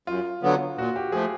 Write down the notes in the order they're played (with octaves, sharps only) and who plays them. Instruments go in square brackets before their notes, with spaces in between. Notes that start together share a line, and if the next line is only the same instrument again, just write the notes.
[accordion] F#2 [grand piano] F4
[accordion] D3 F#3 B3
[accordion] A#2 [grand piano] F#4
[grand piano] G4
[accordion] F3 A3 [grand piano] G#4